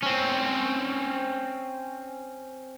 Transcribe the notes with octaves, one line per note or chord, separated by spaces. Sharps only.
C4 C#4